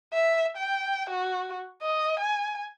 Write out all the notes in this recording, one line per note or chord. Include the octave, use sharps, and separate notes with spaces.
E5
G5
F#4
D#5
G#5